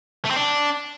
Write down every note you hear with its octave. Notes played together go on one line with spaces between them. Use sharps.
A3
C4
D4